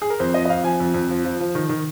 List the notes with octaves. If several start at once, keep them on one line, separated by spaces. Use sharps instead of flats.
G#4
A#4
F2 C5
F3 D#5
D#5
F2 F5
F3 G#5
F2
F2
F3
F3
F3
D#3
D#3